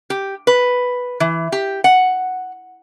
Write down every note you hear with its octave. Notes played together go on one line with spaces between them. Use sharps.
G4
B4
E3
G4
F#5